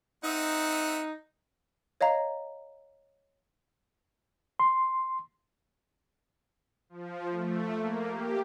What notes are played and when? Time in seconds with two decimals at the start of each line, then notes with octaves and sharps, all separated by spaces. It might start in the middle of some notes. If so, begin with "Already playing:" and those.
0.24 C4 D#4 E5 F#5
2.01 C#5 D#5 F5 A#5
4.60 C6
6.89 F3
7.30 A3
7.77 A#3
8.10 G4